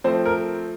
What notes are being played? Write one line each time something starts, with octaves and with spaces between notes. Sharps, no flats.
F3 A3 C4 C5
A#4